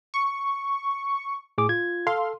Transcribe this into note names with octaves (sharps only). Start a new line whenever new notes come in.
C#6
A2 G#4 D6
F4 G#6
A4 F5 C6